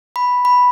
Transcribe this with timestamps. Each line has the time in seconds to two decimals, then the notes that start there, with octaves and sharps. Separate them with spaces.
0.16 B5
0.45 B5